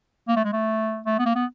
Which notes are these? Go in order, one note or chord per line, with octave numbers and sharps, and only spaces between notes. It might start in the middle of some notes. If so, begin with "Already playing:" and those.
A#3
A3
G#3
A3
A3
B3
A#3
B3